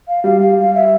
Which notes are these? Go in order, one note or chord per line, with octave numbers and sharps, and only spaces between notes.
F5
G3 F5
F5
F5
E5